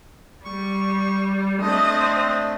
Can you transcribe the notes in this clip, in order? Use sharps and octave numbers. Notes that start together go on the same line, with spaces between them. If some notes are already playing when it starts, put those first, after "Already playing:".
G3 C#6
A3 C4 D4 D#5